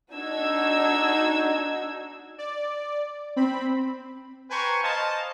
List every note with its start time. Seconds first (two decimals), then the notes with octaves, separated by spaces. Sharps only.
0.12 D4 D#4 F#4 E6 G#6
2.38 D5
3.36 C4 B5
4.50 B4 C5 G5 G#5 A#5 C#6
4.83 C5 D#5 F5 A5